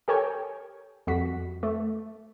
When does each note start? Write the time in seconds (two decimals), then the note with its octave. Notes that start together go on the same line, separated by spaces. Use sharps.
0.08 G4 A4 A#4 C#5 G5 G#5
1.07 F2 G3 F#4 B6
1.63 A3